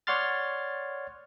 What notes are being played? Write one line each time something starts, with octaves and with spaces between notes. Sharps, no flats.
C#5 D5 F#5 C6 F6 A6